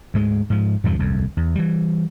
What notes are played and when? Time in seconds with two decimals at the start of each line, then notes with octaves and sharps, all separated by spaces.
0.14 D2 G#2 G#3
0.50 G#2 F3
0.84 E2 G2 C3 F3
0.99 D#1 C2 F2
1.37 E2
1.55 E3 G3